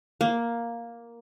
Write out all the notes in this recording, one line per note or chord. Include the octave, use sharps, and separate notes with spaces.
A#3